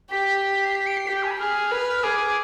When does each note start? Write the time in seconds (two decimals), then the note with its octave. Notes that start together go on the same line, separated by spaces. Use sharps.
0.11 G4 B6
0.65 C7
0.75 B6
0.86 D7
0.97 C7
1.07 G4 B6
1.15 G6
1.23 G#5
1.31 B5
1.39 G#4 F6
1.72 B4
2.03 G#4 D6